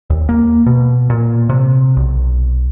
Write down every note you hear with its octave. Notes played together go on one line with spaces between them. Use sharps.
D#2
A#3
B2
A#2
C3
B1